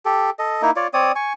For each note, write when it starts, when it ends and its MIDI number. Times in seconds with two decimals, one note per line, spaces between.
0.05 0.30 67
0.05 0.30 69
0.39 0.62 69
0.39 0.62 75
0.62 0.71 58
0.62 0.71 63
0.62 0.71 64
0.76 0.87 65
0.76 0.87 73
0.76 0.87 74
0.94 1.12 60
0.94 1.12 73
0.94 1.12 74
0.94 1.12 87
1.15 1.33 80
1.15 1.33 85